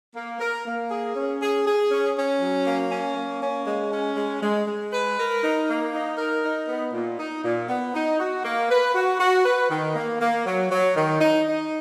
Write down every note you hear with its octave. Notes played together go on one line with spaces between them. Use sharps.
A#3
A#4
A#3
G#4
C#4
G#4
G#4
C#4
C#4
F#3
A#3
C#4
A#3
C#4
G#3
C#4
G#3
G#3
G#3
B4
A#4
D#4
A#3
D#4
A#4
D#4
B3
A#2
D#4
A#2
B3
D#4
F#4
A#3
B4
F#4
F#4
B4
D#3
A#3
A#3
F#3
F#3
D#3
D#4
D#4